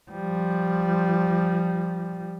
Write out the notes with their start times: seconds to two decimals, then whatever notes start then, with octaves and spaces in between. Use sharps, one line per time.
0.11 F3 G3